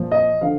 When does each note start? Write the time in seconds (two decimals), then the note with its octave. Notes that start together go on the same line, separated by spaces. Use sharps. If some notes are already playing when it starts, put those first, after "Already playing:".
Already playing: A#2 F3
0.11 D#5
0.41 D3 F3 F5